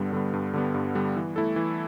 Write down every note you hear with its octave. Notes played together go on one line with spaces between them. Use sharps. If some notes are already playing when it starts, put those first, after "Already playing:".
Already playing: G2 D3 G3 B3
D3 G3 B3
G2
D3 G3 B3
G2
D3 G3 B3
E3
A3 E4 A4
E3